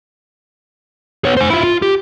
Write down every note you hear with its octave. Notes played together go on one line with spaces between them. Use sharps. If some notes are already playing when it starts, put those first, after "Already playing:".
B3 C#5
C5 G#5
E4 F4
F4
G4